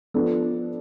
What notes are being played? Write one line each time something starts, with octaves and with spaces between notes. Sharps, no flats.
F3 B3 D4 A4